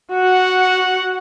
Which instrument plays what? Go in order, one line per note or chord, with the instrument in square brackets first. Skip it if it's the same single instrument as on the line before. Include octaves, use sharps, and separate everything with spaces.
[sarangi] F#4 [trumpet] F#5